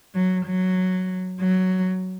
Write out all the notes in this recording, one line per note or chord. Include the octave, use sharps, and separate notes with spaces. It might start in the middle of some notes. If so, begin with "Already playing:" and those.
F#3
F#3
F#3